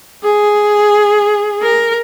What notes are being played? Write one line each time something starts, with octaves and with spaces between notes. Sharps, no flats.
G#4
A#4